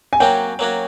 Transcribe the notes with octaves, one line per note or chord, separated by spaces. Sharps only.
G#5
F#3 A#3 C#4 F#4 G5
F#3 A#3 C#4 F#4